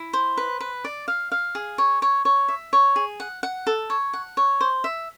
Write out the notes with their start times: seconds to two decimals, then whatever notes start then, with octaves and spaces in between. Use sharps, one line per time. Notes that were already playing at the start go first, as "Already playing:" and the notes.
Already playing: E4
0.13 C5
0.37 B4
0.61 B4
0.85 D5
1.08 F5
1.32 F5
1.55 G#4
1.78 C#5
2.02 C#5
2.25 C#5
2.49 E5
2.73 C#5
2.96 G#4
3.20 F#5
3.43 F#5
3.67 A4
3.90 C#5
4.13 F#5
4.37 C#5
4.61 C5
4.84 E5